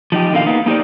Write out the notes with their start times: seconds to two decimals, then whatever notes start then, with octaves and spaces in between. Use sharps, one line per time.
0.12 F3 D#4 G4
0.33 E2 B2 D3 D#3 A#3 F5
0.46 A#3 B3 D#4
0.66 A#3 D#4 G4 C5 D5